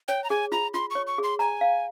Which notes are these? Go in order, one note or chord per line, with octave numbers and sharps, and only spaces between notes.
C#5 G5
A#5
G#4 G#5
F4 A#5
F4 C6
C#5 C#6
C#6
G#4 C6
G#5 A#5
F5